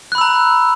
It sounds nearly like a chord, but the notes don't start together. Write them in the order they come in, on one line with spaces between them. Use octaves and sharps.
F#6 B5 E6 A#5